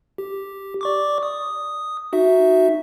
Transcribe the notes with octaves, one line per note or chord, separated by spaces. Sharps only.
G4
D5 C#6 D6
D#6
D#4 F#4 E5